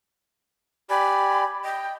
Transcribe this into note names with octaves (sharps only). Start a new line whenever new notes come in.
G4 D5 G#5 B5
D#5 G5